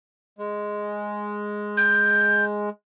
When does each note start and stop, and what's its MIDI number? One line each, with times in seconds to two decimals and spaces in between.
0.39 2.69 56
1.77 2.45 91